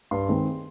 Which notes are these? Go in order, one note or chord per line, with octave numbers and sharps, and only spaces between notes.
G2 C6
D#3 G#3 C4